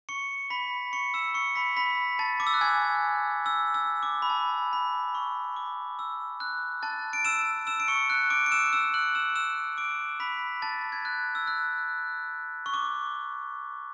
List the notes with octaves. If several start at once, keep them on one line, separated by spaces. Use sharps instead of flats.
C#6 C#7
B5 B6
C#6 C#7
E6 E7
C#6 C#7
B5 B6
B5 B6
A5 A6
D6
E6
F#6
G#5 G#6
E6
E6
D6
B5
A5
B5
C#6
D6
E6
F#6
A5 A6
D7
E6 E7
E6 E7
D7
C#6 C#7
F#6
D6 D7
D7
E6 E7
E6 E7
F#6 F#7
E6 E7
E6 E7
D6 D7
B5 B6
A5 A6
G#6
F#6
E6
F#6
C#6
D6